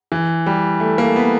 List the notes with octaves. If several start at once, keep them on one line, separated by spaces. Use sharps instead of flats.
E3
G3
A3
A#3
B3